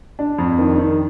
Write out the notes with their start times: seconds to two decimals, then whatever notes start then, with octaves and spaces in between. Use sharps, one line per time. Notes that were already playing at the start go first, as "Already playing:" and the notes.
0.19 D4
0.39 F2
0.58 D#3
0.78 D#3